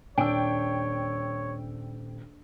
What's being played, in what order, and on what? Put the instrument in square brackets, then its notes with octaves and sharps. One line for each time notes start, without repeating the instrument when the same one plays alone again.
[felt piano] D#1 E6 [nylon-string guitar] D4 [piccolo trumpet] C#5 [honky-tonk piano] G5 D7